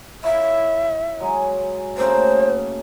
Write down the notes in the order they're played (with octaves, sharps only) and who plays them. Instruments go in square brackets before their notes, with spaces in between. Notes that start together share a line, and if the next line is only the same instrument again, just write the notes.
[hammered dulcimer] E4 C#5 F5 [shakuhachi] E5
[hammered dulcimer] F#3 G#3 G#5
[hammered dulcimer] C#3 A3 A#3 [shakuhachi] C5